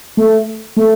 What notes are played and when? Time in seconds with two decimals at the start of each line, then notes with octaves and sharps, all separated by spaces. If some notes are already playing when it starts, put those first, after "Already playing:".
0.17 A3
0.77 A3